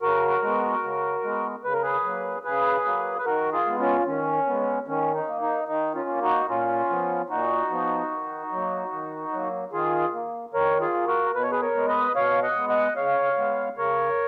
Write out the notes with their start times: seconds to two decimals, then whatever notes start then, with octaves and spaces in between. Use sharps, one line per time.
0.02 C#3 F#4 A#4
0.42 G#3 B3
0.83 C#3
1.23 G#3 B3
1.64 C#3 B4
1.73 A#4
1.82 G#4 B4
2.04 F#3 A#3
2.44 C#3 G#4 B4
2.85 F#3 A#3
3.18 B4
3.25 D#3 F#4 A#4
3.52 F4 G#4
3.66 G#3 B3
3.80 C#4 F4
4.06 D#3 C#4
4.47 G#3 B3
4.87 D#3 C#4
5.14 D#4
5.28 A#3
5.41 D#4
5.68 D#3 D#4
5.95 C#4 F4
6.09 A#3
6.22 D#4 F#4
6.49 A#2 C#4 F4
6.90 F3 B3
7.30 A#2 D#4 F#4
7.70 F3 B3
8.11 D#3
8.51 F#3 A#3
8.92 D#3
9.33 F#3 A#3
9.72 D#3 F4 G#4
10.13 A#3
10.54 D#3 A#4 C#5
10.80 F4 G#4
10.94 A#3
11.07 F#4 A#4
11.35 B2 B4
11.43 C#5
11.51 G#4 B4
11.61 A#4 C#5
11.75 G#3 B3
11.88 B4 D#5
12.15 B2 C#5 F5
12.42 D#5 F#5
12.56 G#3 B3
12.69 D#5 F#5
12.96 C#3 C#5 F5
13.37 G#3 B3
13.77 C#3 A#4 C#5